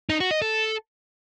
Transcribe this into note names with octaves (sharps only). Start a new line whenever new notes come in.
D#4
F#4
D#5
A4